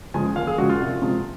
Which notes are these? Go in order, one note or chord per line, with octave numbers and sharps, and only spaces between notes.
C#3 F3 G#3 G#5
D#2 F5
G#4
C#3 F3 G#3 F#4
F4
C2
C3 F3 G#3